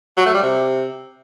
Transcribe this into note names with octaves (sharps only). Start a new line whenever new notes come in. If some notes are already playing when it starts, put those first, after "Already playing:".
F#3
A3
G3
C3